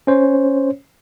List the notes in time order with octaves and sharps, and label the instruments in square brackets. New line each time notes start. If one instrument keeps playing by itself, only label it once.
[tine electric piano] C#4 C5 C#5